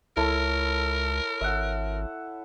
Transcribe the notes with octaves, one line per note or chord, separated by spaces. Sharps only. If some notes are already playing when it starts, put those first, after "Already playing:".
C#2 E4 A4 A#4 C#5
G#1 E5 F#5